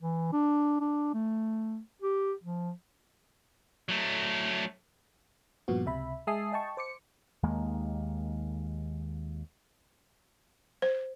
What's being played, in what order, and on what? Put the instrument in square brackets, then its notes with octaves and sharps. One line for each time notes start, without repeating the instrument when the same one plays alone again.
[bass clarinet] E3
D4
D4
A3
G4
F3
[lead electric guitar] F#3 A3
[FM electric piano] G2 A#2 F3 B3 F#4
C#2 C3 E5 B5
G#3 E5 G#5 A5 D#6 C7
D#5 G5 A5 C#6
C5 D6 C#7
[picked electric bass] D#2 D#3 G#3 A#3
[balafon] C5